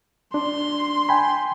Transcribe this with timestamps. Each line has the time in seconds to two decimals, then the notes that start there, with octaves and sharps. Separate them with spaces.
0.34 D4 C6
1.09 G5 G#5 B5